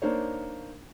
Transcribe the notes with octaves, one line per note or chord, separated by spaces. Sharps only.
A#3 D4 D#4 C5 C#5